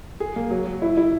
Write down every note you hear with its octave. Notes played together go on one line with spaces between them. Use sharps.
G#4
A#3
F#3
F#3
E4
E4